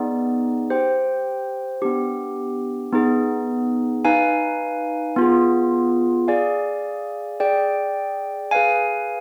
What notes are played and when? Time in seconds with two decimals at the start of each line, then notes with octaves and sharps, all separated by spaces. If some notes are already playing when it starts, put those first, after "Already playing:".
Already playing: B3 D#4 G#4 D5
0.70 G4 C5 G5
1.82 B3 D4 G4
2.93 B3 D#4 G#4
4.05 D#4 B4 F5 G#5
5.16 B3 F4 G#4
6.28 G#4 D5 F5 G#5
7.40 G#4 D5 G5
8.51 G#4 B4 F5 G#5